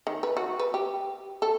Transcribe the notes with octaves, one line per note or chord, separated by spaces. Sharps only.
D#3
B4
F#4
B4
G4
A4